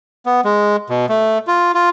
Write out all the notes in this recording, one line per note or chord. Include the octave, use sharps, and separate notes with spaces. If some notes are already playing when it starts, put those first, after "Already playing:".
B3
G#3
B2
A3
F4
F4